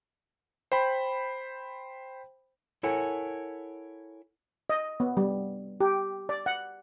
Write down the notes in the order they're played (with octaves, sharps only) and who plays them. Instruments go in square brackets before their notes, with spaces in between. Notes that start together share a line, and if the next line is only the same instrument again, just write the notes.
[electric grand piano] C5 G5 B5
[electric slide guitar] E4 A4 A#4 C#5 F#5 G#5
[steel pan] D#5
B3
G3
G4
D5
F#5